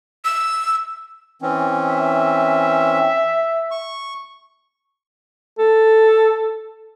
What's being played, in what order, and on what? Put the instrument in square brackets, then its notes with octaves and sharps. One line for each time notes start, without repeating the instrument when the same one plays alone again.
[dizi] E6
[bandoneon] E3 C4 C#4
[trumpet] E5
[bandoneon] C#6
[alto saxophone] A4